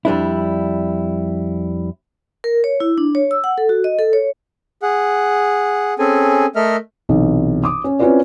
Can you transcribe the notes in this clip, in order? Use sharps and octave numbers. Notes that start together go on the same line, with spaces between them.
F2 G3 D4 E4
A#4
C#5
E4
D4
C#5
E6
F#5
A4
F#4
D#5
A4
C#5
G#4 F#5
C4 C#4 G#4 A4 G#5
A3 A4 A#4 D#5 E5 F6
B1 C3 E3
D6 D#6
C#4
C4 C#4 E4 F4 B4 D5